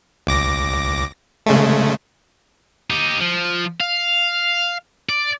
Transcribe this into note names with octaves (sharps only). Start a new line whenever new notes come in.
C#2 D6 A#6
C#3 G#3 A3
D#4 G4
F3
F5
D5